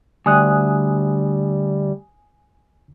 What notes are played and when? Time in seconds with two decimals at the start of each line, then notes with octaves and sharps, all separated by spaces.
0.26 D2 G3 G#5 D#6 F#6